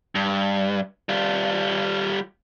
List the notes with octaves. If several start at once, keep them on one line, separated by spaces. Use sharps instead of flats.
G2
G3 F4